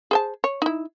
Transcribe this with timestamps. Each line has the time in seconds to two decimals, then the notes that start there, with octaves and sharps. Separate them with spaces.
0.11 G#4 C5 A5
0.44 C#5
0.62 D#4 E4